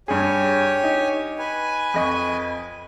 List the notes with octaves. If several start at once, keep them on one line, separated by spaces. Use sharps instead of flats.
G2 G4 G#4 C#5 G#5
D#4
B4 G#5
F2 D#5 C#6